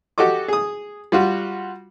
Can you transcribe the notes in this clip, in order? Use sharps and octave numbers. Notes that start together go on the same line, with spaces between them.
F#4 G4 A4 D#5 D6
G#4 D#6
G3 F4 F#4